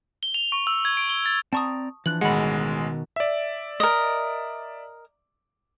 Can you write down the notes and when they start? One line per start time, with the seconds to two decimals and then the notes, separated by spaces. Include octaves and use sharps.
0.23 G7
0.34 F7
0.52 C#6
0.67 E6
0.85 G#6
0.97 D7
1.09 G7
1.26 A6
1.53 C4 D5 A5 A#5 C#6 D#6
2.06 E3 F3 D4 F#6 F#7
2.21 A1 B2 D#3 G#3 F#4 F#5 B5
3.16 D5 E5
3.80 A#4 D#5